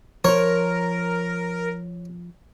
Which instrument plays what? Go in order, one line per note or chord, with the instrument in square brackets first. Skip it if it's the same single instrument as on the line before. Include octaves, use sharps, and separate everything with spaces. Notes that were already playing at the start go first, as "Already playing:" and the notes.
[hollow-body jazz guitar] F3 C5 [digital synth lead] A#4 [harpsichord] C#5